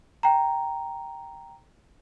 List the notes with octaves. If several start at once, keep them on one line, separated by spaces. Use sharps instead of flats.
G5 A#5